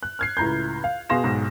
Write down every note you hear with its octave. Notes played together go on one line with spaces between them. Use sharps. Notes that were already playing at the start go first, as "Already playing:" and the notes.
F#6
F6 G#6 C7
C#2 A2 A#5 B5 G6
F5
B2 G#4 F5 C6 A#6 E7
B1 G#2